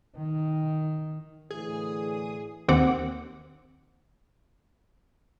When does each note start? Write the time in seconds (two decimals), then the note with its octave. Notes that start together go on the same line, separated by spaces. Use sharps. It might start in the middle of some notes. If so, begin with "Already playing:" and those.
0.17 D#3
1.50 A2 D3 E3 G#4
2.68 D#2 C4 F#5 D6